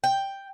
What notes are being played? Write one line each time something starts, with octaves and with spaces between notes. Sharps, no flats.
G5